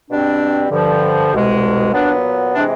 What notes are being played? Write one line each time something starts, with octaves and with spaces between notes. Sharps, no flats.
B2 G3 C4 D4
G2 D3 F3
C2 B2 G#3
A#2 F#3 B3 D4
C3 E3 G#3 C4 D4